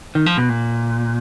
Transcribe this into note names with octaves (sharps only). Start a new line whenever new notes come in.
D#3
F3
B2
A#2